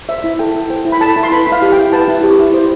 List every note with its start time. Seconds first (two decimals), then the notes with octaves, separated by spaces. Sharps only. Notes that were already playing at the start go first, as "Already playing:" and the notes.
0.09 C5 E5
0.24 E4
0.39 A4 G5
0.55 E4
0.70 C5 G5
0.85 E4
0.92 B5
1.01 A4 A5
1.16 E4
1.23 C6
1.32 B4 B5
1.47 E4 F5
1.62 G4
1.73 G5
1.78 E4
1.92 B4 A5
2.08 E4
2.23 G4
2.39 E4
2.54 C5